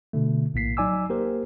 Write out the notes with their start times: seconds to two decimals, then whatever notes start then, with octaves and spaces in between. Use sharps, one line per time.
0.13 B2 D3 A3
0.54 A#1 A2 A#3 B6 C7
0.77 F#3 D#4 D5 G#5 D6 E6
1.10 A#3 G4 A#4 C5